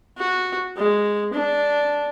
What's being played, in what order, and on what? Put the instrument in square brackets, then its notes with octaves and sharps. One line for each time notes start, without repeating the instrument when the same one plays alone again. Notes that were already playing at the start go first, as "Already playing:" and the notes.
[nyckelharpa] F#4
G#3
D4